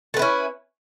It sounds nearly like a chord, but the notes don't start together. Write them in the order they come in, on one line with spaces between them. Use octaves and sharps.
A4 B4 E4 C#4